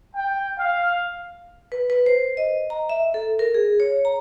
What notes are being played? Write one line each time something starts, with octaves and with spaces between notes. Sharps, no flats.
G5
F5
B4
B4
C5
D#5
A#5
E5
A4
A#4
G#4
C#5
A#5